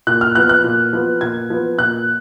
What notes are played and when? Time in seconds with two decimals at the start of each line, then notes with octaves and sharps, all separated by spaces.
0.07 A#2 F#6
0.21 F6
0.35 F3 B3 F#6
0.49 F#6
0.64 A#2
0.93 F3 B3
1.21 A#2 G#6
1.50 F3 B3
1.78 A#2 F#6